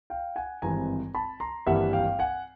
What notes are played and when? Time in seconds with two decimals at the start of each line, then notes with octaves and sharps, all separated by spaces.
0.10 F5 G5
0.36 F#5 G#5
0.62 G#1 G2 E3 G#3 C4 G#5 A#5
1.15 A5 B5
1.40 A#5 C6
1.66 G#1 G2 E3 G3 A#3 E5 F#5
1.93 F5 G5
2.19 F#5 G#5